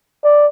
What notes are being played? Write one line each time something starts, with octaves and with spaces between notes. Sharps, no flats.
D5